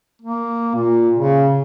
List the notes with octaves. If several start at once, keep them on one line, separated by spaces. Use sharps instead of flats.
A#3
A#2
C#3